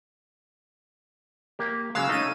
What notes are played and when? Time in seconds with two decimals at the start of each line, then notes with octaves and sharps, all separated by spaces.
1.59 A#3 G4
1.95 C#3 F#3 G#3 F5 E6
2.09 A3 C#4 D#4 D#7